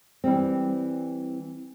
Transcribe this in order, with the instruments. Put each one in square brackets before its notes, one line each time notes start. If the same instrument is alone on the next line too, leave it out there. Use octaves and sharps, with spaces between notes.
[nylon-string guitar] E3 G3 C4